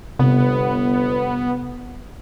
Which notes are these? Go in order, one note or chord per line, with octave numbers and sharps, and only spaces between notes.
G1 C3 B3